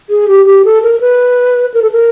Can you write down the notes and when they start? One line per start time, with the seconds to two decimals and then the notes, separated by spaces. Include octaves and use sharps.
0.10 G#4
0.28 G4
0.46 G4
0.65 A4
0.82 A#4
1.01 B4
1.74 A#4
1.82 A4
1.92 A#4